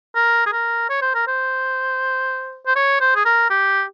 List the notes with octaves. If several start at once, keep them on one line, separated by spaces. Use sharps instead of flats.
A#4
G#4
A#4
C#5
C5
A#4
C5
C5
C#5
C5
G#4
A#4
G4